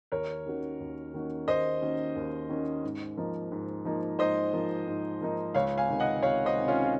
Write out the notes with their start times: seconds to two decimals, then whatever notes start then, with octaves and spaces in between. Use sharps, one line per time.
0.12 D#2 A#4 C#5
0.46 D#3 A#3 C#4 F#4
0.80 D#2
1.14 D#3 A#3 C#4 F#4
1.48 D#2 C5 D#5
1.82 D#3 A#3 C#4 F#4
2.16 D#2
2.49 D#3 A#3 C#4 F#4
2.84 G#2
3.17 F3 A#3 D#4
3.52 G#2
3.85 F3 A#3 D#4
4.19 G#2 C5 D#5
4.53 F3 A#3 D#4
4.88 G#2
5.21 F3 A#3 D#4
5.54 C#2 C#5 F5
5.78 F5 G#5
5.89 C3 D#3
6.00 D#5 F#5
6.23 C#2 C#5 F5
6.45 C5 D#5
6.57 C3 D#3
6.68 C#4 F4
6.84 F4